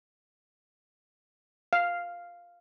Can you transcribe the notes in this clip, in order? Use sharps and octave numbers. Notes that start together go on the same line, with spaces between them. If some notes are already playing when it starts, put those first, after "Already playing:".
F5